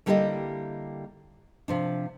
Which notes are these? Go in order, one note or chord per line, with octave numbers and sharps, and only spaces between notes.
D3 G3 A#3 E4 G4 D#5
C3 F3 D4